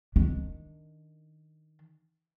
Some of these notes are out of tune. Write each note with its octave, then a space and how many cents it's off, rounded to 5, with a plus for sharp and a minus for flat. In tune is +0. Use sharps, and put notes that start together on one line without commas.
D#3 +0 D4 +0